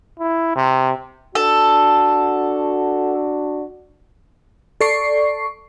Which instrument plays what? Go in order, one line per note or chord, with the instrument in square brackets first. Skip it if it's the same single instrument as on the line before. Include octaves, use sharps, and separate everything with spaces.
[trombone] E4
C3
[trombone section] D4 F#4 [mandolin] A4
[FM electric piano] A4 D5 C#6 C7